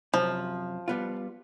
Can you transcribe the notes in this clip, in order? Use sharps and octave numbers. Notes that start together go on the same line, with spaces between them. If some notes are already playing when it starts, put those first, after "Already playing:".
F#2 C3 F3
G3 B3 F4